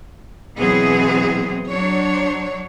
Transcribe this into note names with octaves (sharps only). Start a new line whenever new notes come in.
B2 E3 F#3 B3 C4 G#4
F#3 D4 C#5